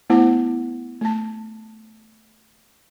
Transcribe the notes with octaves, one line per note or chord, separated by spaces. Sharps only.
A3 B3 E4 C5 F#5
A3 A5